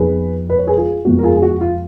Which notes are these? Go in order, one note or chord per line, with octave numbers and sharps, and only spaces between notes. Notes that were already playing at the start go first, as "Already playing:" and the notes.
Already playing: F2 F3 B3 D#4 G#4 B4
B4
C#5
G#4 B4
F4 G#4
F2 F3 G#3 B3 F#4
A#4
F4 G#4
G#4
F#4
F4